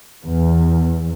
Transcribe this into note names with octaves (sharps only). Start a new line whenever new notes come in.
E2